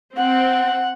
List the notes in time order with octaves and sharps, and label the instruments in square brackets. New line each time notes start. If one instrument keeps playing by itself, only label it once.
[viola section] C4 [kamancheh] F#5